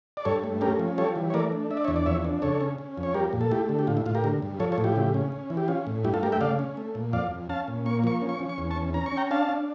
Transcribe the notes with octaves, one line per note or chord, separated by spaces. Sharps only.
D5
G2 A4 C#5
A3
C#4 G4 A#4
F3
G3 A4 C#5
E3
C#5
A3 A#4 D5
D4
D4 E5
D5
C#5 E5
E2
D5
F2 C#5 E5
D4
C#3 A4 C#5
C#4
C#4
F2
C#5
G3 G4 A#4
A#2
A4
A3 E4 G4
D3
G4
A2 F4
E4
A2 F4
G4 A#4
D3
G2
F3 A4 C#5
A4 C#5
A2
E4 G4
C#3
C#4
C#4
E3
G4
C#4 F4
A2
G2 E4 G4
F4 A4
A3 G4 A#4
E5 G5
C#3 D5 F5
C#4
A3
A#2
F2 D5 F5
F2
C#4 F5 A5
A#2
A#3 C#6
F3 C#6
C#4
C#6
C#4
C#6
E2
A5 C#6
C#4
C#4 A#5
C#6
C#4
G5 A#5
D4 F5 A5
D4